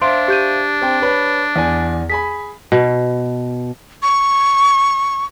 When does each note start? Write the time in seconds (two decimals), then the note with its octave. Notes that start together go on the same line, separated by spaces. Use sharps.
0.02 D4 C5 E5 F5 C6 D7
0.28 G4 G6 D#7
0.81 C4 G5
1.02 B4 C#5 B5
1.56 E2 D5 G#5
2.10 G#4 G#5 B5 B6
2.72 B2
4.02 C#6